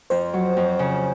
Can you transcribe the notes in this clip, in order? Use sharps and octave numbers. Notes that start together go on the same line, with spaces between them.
F2 C5
F#3
F2
C#3